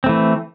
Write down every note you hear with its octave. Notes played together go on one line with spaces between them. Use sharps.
E3 A3 C4